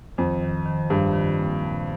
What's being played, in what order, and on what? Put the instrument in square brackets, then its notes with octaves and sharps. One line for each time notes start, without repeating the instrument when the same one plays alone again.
[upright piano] F2 [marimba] D#3
[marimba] D#3
D#3
[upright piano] G2 [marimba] D#3
[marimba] D#3
A#3
A#2